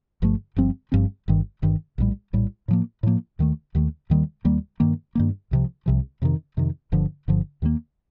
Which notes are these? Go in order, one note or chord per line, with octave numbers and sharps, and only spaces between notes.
G1 G2 F3 A3
G1 G2 F3 C4
G1 G2 F3 C4
G1 G2 D#3
G1 G2 D#3
A#1 A2 G3
A#1 A2 G3
A2 F3 A#3
A2 F3 A#3
D#2 D#3 A3
D#2 D#3 A3
D#2 D#3 G3 A#3
D#2 D#3 G3 A#3
G2 D#3 A#3
G2 D#3 A#3
C2 C3 F3
C2 C3 F3
F2 C3 D#3
F2 C3 D#3
G1 G2 D3 F3
G1 G2 D3 F3
D#2 D#3 G3 A#3